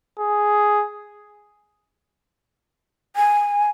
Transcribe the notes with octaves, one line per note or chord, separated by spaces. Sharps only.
G#4
G#5